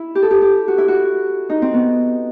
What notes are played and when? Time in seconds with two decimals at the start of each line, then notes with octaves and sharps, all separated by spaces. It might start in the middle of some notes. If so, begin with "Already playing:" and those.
Already playing: E4
0.15 G4
0.22 A4
0.31 G4
0.41 G4
0.68 F#4
0.78 E4
0.88 F#4
1.49 D#4
1.62 C4
1.74 B3